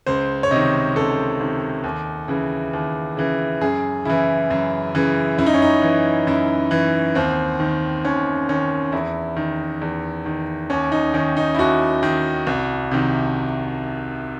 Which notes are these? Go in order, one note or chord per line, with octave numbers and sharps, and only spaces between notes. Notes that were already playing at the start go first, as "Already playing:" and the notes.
C#2 C5
C#5
C3 D#3 D#5
C#2 A4
C3 D#3
D#2
C#3 E3
D#2
C#3 E3
F#2 G#4
C#3 E3 E4
F#2
C#3 E3
F#2 E4
D#4
C#4
D#4
E3
F#2 E4
E3
D#2 C4
D#3
D#2 C#4
D#3 C#4
E2 E4
D#3
E2
D#3
D#2 C#4
D#4
D#3 C#4
D#4
E4
D#2 F#4
D#3
C2
C3 D#3